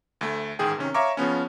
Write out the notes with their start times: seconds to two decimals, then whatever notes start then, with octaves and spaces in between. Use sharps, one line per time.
0.21 D2 A3
0.59 A1 G#2 D#3 G#4 G5
0.78 C3 D#3 C#4
0.94 C#5 E5 F5 A#5 C#6 D6
1.17 C#3 F3 B3 C#4